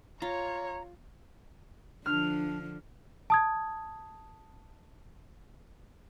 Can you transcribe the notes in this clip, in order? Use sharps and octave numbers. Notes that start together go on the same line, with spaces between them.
F4 C#5 A#5
D3 F3 D4 F6
A5 D#6 G#6